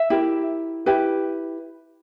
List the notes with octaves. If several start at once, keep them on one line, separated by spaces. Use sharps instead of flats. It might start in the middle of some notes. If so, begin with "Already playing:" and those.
Already playing: E5
E4 G4 A#4
E4 G4 B4